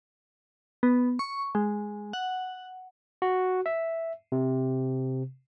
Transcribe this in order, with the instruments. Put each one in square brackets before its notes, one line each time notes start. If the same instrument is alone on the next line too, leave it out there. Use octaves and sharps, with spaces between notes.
[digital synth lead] B3
C#6
G#3
F#5
[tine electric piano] F#4
E5
C3